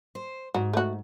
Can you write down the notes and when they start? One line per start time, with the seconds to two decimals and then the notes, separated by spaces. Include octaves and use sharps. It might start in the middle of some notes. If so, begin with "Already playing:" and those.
0.15 C5
0.54 G#2 F#4
0.73 A3 F#4